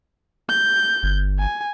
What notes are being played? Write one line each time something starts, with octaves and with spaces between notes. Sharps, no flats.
G6
G1
G#5